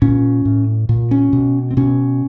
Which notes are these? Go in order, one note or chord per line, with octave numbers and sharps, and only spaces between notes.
A#2 C#4
A2
A#2
C#4
B2
C4
B2 C#4